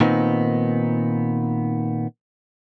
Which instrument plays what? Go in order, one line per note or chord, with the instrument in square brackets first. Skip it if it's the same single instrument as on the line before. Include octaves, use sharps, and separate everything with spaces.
[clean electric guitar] A#2 D#3 B3 C4 D#4